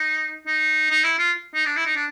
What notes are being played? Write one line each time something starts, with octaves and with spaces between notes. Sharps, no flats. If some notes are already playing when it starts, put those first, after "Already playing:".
Already playing: D#4
D#4
D#4
E4
F4
D#4
D4
E4
D#4
D4